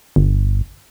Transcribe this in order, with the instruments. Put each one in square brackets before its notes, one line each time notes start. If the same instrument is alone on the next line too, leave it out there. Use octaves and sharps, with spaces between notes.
[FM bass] G1